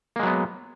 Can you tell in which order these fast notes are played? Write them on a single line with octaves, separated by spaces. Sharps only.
A#3 G#3 F#3 B3